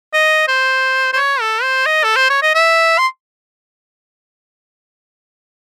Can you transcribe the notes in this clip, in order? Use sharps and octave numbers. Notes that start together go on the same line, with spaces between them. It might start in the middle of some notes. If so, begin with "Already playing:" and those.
D#5
C5
C5
C#5
A4
C5
D#5
A4
C5
C#5
D#5
E5
C6